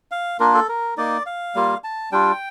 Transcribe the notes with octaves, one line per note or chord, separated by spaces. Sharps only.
F5
A#3 D4 F4 A#4
A4
A#4
A#3 D#4 D5
F5
G3 A#3 F4
A5
G3 D4 F4 G5